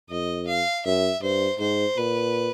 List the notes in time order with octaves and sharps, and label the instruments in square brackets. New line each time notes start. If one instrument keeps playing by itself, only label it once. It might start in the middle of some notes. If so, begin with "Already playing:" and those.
[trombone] F2 [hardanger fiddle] D#5
[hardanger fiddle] F5
[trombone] F#2 [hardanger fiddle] E5
[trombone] G2 [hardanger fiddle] C5
[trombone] G#2 [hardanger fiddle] C5
[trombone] A#2 [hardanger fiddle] B4